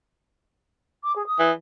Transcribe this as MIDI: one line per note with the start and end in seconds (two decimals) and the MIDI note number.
1.03 1.14 86
1.16 1.25 68
1.27 1.50 87
1.39 1.52 52